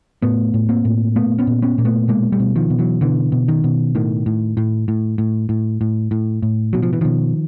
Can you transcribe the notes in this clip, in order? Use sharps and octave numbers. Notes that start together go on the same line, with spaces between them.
A2 A3 B3
A2
A#3 C4
A2
A#2 A3 B3
B3 C#4
A#2
B3 C#4
A#2 A#3
A3 B3
B2 G#3 A#3
G3 A3
B2
D#3 F3
B2
E3 F#3
B2 D3 E3
B2
D#3
B2
A2 D#3
A2
A2
A2
A2
A2
A2
A2
A2
B2 F#3
F3
E3
B2 D#3 F3